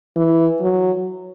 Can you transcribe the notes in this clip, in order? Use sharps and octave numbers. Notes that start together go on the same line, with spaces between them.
E3
F#3